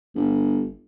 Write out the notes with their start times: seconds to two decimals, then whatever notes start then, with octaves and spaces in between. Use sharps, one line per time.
0.16 G1